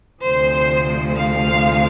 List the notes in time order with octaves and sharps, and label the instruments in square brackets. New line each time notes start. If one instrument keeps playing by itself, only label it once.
[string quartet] D2 C3 F3 C5
F5